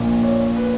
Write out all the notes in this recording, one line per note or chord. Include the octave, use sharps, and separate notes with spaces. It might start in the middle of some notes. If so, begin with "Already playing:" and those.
Already playing: A#1 A#2 A#3
C#5
B4